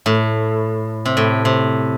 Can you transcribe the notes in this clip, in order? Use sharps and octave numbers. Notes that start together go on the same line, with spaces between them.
A2
C3
A2
C3